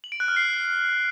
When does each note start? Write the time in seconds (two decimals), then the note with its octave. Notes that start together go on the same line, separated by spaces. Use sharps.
0.04 F#7
0.12 D7
0.20 F#6
0.28 F6
0.36 C7